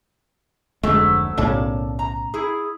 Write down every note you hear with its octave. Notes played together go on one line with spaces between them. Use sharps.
F1 D2 G#2 F#3 G#3 A3
B1 A2 C#3 A#3 D5 A5
A#5
E4 G#4